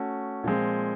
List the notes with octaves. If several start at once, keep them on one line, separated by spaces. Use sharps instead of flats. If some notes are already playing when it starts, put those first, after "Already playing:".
Already playing: A3 C#4 F#4
A#2 F3 G#3 C4